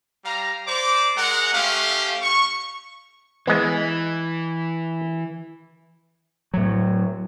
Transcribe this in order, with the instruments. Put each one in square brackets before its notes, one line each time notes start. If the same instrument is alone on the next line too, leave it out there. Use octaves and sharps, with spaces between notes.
[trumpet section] G3 F5 A#5
C5 D5 A#5 D6
G#3 A#4 F#5
A3 C#4 G4 F5
C#6
[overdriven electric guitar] E3 [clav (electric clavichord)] G#3 B3
[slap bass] A2 F#3